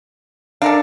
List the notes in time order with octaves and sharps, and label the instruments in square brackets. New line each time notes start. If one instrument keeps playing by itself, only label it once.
[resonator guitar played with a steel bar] D4 [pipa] A4 A#4 F5